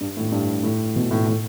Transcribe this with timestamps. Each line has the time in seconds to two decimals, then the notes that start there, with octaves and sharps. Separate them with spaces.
0.01 G2
0.17 A2
0.32 G2
0.63 A2
0.96 B2
1.11 A2
1.26 A2